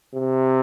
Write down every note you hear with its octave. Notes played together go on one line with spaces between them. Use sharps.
C3